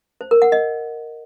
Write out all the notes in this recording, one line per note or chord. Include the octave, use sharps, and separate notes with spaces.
C5
A#4
F#5
D#5